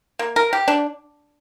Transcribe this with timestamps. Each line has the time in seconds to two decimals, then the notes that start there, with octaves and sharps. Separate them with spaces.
0.19 A#3
0.36 A#4
0.53 G4
0.68 D4